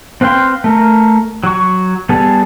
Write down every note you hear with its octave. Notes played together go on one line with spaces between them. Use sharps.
C4 B4 F5 G5 C6
A3 A#4
F#3 C#6
G3 B3 G#4 A4